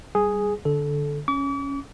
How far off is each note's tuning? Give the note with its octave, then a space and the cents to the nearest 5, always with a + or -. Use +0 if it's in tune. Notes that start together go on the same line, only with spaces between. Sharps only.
G3 +5 G#4 +0
D3 +0 A4 -15
C#4 +0 D6 -45